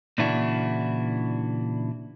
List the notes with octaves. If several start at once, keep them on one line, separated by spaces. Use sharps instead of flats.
A#2 C#3 E3 D4 E4 F#4